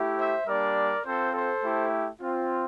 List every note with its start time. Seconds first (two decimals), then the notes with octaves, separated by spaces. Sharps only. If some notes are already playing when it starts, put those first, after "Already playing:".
Already playing: A3 E4 G4
0.18 C5 E5
0.47 G3 A#3 D4 A#4 D5
1.05 C4 F4 A4 C5
1.34 A4 C5
1.63 A3 E4 G4
2.21 C4 F4